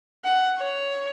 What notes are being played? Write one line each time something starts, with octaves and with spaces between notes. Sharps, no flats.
F#5
C#5